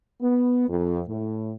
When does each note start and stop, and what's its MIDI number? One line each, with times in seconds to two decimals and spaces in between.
0.22 0.66 59
0.69 1.01 41
1.08 1.54 45